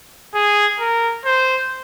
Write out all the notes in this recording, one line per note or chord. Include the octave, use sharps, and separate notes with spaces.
G#4
A#4
C5